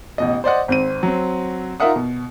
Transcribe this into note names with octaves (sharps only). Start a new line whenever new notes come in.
A1 B2 D#5
C5 D5 D#5 F#5
G#1 C4 D#7
F#3 C4
D#4 F4 A#4 E5 F#5 D#6
B2